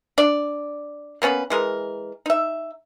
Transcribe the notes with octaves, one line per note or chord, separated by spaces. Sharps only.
D4 D5
A#3 B3 C#4 B4
E3 G#3 A#4
D#4 E5